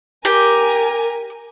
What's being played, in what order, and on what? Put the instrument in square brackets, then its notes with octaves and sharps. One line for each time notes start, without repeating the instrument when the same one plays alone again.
[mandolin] G4 [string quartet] A#4 G#5